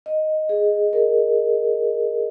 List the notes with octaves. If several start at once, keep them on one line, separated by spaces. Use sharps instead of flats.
D#5
G#4
A#4